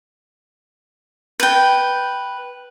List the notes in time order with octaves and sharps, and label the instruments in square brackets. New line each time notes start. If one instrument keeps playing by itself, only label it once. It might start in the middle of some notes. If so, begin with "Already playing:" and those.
[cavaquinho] B4 G5